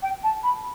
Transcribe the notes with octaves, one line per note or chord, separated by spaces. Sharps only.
G5
A5
B5